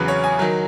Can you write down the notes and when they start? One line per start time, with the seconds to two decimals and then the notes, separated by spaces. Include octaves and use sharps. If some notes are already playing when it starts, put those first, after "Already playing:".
Already playing: E2 C#3 F#3 B4
0.08 C#5
0.24 G#5
0.39 D#3 F#3